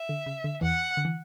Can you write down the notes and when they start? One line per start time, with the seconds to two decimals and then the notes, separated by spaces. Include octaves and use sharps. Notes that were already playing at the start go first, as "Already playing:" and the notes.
Already playing: E5
0.09 D3
0.26 C#3
0.44 D3
0.61 E2 E3 F#5
0.97 D3
1.05 E3